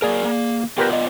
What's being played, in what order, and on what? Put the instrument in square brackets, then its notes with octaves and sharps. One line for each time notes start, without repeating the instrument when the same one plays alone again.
[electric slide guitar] F#3 A#3 A#4 [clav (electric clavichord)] G#4 D5
[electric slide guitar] A#3
[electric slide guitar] B3 F4 D5 [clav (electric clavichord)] G4 A#4 B4
[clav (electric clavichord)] D#5